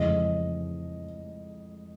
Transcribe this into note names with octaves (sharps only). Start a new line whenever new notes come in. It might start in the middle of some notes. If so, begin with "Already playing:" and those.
Already playing: F2 C#3 E3 G#3 D#5